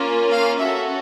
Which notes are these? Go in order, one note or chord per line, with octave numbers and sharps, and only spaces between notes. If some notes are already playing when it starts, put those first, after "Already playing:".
Already playing: A#3 C#4 F4
F5
C#4 F#4 A4 E5